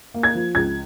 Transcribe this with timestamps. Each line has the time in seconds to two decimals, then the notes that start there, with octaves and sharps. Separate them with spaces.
0.14 A#3
0.23 G#6
0.35 F3
0.55 C#2 G#6